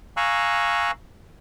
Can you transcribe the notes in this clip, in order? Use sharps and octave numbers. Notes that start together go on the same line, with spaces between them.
F5 G#5 A#5 C#6 E6 F#6